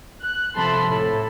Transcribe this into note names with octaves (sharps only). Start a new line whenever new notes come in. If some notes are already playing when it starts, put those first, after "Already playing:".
F#6
C3 F3 A4 A5 B5 C6
A2 A4